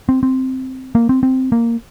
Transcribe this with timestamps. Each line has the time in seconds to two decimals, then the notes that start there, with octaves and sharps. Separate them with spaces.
0.09 C4
0.23 C4
0.95 A#3
1.09 C4
1.23 C4
1.52 A#3